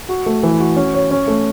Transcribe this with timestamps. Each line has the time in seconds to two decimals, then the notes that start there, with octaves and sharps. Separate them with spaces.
0.09 F#4
0.26 A3
0.43 E3
0.60 F#4
0.76 C#4
0.94 C#5
1.11 C#4
1.28 A3